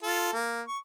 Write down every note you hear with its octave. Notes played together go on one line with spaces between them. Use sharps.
F4 A4
A#3
C#6